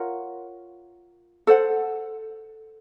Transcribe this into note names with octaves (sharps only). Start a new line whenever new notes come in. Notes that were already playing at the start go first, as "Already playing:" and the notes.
Already playing: F4 A#4 C#5 F#5
A4 C5 F#5